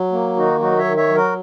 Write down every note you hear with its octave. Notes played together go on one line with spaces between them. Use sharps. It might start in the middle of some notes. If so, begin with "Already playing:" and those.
Already playing: F#3
A#3
D#3 D#4 F#4
F#3 D#4 F#4
C#5 E5
D#3
C#5 E5
F#3
F#4 A#4